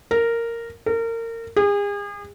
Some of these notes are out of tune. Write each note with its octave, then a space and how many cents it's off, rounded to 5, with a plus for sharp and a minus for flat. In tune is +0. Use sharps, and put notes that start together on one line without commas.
A#4 -10
A#4 -30
G#4 -40